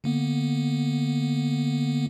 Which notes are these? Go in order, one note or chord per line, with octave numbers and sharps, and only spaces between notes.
D3 A#3 B3